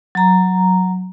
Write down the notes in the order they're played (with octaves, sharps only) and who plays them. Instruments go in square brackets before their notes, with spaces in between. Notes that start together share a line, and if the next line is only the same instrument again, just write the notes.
[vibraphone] F#3 A#5